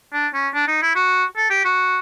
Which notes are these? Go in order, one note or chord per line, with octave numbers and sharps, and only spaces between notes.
D4
C#4
D4
D#4
E4
F#4
A4
G4
F#4